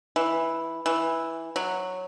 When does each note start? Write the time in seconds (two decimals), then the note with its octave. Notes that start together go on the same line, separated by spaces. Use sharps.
0.16 E3
0.86 E3
1.56 F#3